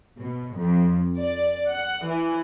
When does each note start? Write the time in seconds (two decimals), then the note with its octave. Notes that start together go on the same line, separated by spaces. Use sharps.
0.19 B2
0.59 F2
1.18 D5
1.70 F#5
2.05 E3